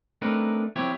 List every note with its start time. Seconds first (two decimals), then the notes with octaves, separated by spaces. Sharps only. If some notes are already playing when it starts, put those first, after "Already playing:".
0.22 A3 C4 D4 D#4 A#4 B4
0.76 F3 C4 E4 G4 C#5